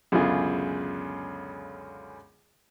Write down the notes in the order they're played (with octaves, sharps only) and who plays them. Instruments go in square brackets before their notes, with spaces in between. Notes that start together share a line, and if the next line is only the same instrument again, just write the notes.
[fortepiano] C#2 F#2 B2 D3 F4 G#4